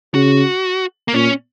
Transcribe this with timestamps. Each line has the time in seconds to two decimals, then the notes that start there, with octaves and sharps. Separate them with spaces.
0.14 C#3 F#4
1.08 A#3
1.13 A#2 C#4